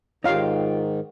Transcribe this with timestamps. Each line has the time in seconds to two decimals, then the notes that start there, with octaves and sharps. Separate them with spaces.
0.24 G#2 D#3 D#4 F4 G4 C#5 F5